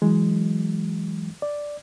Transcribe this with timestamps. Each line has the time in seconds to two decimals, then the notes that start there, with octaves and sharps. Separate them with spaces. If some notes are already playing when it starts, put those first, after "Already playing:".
0.02 E3 F#3 G#3
1.42 D5